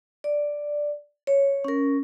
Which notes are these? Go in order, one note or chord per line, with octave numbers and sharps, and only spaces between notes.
D5
C#5
C#4 A#4